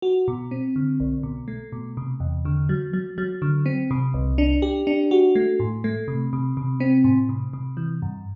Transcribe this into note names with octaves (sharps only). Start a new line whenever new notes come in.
F#4
B2
C4
D3
B1
B2
A3
B2
C3
E2
D3
F#3
F#3
F#3
D3
C4
C3
C2
D4
G4
D4
F#4
A3
A2
A3
C3
C3
C3
C4
A2
C3
C3
E3
G2